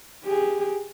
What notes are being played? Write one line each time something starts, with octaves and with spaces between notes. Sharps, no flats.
G4 G#4